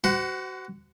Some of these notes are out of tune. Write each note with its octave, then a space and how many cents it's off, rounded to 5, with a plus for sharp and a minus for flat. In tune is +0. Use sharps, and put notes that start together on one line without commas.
F#4 +25 C5 -35 F#5 +0